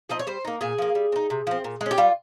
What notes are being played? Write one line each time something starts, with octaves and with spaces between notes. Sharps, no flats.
F3 C4 D#4 D#5
C#5
G3 C5
A#3 D#4
A#2 G#4
F3 A#3
G3
C4
D#4
C3
F3 C4
A#2
G#3
C#4
G4
G3 F4